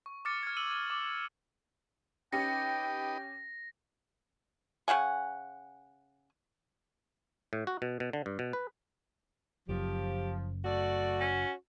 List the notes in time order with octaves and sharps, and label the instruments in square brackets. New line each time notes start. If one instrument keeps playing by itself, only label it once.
[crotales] C#6
D6 F6 A6 C#7
F6 G#6
E6 D#7 F#7
D#7
D6
[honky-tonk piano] C#4 G4 C#7 [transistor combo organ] D#4 B4 [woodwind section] G5 [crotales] A#6
[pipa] C#3 D#4 F#5 G#5
[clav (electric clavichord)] A2
F#4
B2
B2
D3
G2
B2
B4
[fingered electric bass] F#1 F#2 [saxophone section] F3 [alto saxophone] G4
[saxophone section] A3 D5 [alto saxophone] F#4
[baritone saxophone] C#4